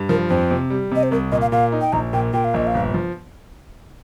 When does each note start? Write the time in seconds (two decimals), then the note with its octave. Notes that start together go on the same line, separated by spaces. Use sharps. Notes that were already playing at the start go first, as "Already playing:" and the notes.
Already playing: G2
0.09 F3 A#4
0.30 F2 C5
0.51 C3
0.70 G3
0.91 C3 D#5
1.03 C5
1.11 C2 A#4
1.32 A#2 D#5
1.41 F5
1.52 A#2 F5
1.72 D#4
1.81 G5
1.93 A#1 A#5
2.13 A#2 G5
2.33 A#2 G5
2.44 F5
2.54 A#1 D#5
2.67 F5
2.74 G1
2.94 F3